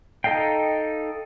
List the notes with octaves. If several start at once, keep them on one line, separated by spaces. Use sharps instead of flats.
D#4 A4 D#5 F5 G5